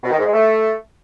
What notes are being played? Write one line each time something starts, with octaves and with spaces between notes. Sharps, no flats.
B2
D#3
G#2
G#3
A3